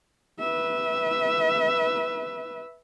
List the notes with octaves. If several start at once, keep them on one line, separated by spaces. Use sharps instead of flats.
B4 E5